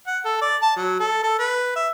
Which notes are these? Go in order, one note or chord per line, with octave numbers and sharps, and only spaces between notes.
F#5
A4
D5
A5
F#3
A4
A4
B4
E5